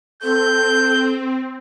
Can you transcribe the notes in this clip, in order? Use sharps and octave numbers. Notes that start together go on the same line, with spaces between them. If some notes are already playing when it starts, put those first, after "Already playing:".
C4 A4 G6